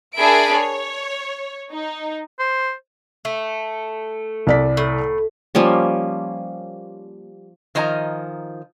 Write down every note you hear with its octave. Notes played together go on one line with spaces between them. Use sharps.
D4 G#4 A#4 E5 B5 D7
C#5
D#4
C5
A3
C2 D5 B6
A2
F3 G3 A#3 C#4
D#3 F3 D#5 G#5 A#5